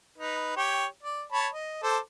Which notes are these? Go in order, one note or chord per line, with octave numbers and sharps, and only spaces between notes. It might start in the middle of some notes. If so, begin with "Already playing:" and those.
D#4 B4
G4 C#5 G5
D5
C#5 A5 B5
D#5
A4 C5 D6